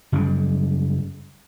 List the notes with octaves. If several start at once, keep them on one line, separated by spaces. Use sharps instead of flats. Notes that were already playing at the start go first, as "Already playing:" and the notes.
F#2 C#3 G3 G#3